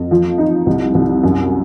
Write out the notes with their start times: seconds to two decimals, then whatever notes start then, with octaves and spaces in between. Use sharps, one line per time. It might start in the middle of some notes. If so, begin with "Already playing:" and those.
Already playing: F2
0.11 F3
0.38 D#4
0.66 C2
0.94 C2
1.23 F#2